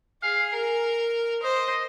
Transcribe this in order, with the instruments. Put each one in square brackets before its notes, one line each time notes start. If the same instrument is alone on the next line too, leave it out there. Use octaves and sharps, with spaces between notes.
[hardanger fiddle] G#4 [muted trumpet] F5
[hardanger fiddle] A#4
[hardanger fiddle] C5 [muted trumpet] D#5